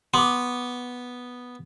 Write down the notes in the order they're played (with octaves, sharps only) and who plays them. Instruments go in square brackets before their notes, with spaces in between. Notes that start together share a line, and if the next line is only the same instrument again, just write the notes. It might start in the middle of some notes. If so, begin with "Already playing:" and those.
[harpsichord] B3 [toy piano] C6 D6